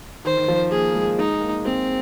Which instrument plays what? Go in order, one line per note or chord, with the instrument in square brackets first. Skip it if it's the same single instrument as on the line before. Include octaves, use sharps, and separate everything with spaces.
[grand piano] D#3 [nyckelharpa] C5
[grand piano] D#3
F3
[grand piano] A#3 [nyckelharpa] G#4
[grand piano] G#3
[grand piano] G#3 [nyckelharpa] D#4
[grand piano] A#3
[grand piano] G#3 [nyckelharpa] C4